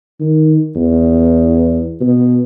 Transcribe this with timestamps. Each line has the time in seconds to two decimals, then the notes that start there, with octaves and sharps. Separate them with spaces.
0.20 D#3
0.76 E2
2.01 B2